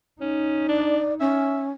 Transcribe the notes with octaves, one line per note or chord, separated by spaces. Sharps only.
C#4 D#4
D4 D5
C#4 E5